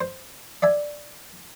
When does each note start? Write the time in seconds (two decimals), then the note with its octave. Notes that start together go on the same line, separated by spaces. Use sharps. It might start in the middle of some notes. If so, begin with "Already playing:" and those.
0.01 C5
0.62 D5 E5 G#5